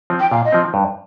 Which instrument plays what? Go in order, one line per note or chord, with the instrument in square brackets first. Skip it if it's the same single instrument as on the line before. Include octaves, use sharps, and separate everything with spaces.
[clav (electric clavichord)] F3 C4
[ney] G5
[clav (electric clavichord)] A#2 [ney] F5
[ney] D#5
[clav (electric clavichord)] F3 C4
G2